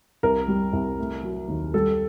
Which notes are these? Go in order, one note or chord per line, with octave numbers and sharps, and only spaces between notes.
C2 A#4
G3
C2
A3
F#3
D#2
G3 A4